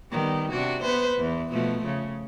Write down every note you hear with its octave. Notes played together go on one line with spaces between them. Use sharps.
D#3 G3 B3
C3 D4 F#4
B3 B4 C5
E2
B2 F3 A3
C#3